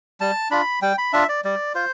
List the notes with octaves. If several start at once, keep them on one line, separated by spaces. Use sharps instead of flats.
G3 A5
D4 F4 B5
G3 G5
B5
D4 F4 E5
D5
G3 D5
F4 C5